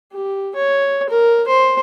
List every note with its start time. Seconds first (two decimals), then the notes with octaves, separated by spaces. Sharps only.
0.12 G4
0.56 C#5
1.10 A#4
1.48 C5